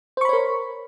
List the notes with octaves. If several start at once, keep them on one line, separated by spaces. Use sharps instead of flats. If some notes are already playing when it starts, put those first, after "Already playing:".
A#4 C5 C#5 B5 C#6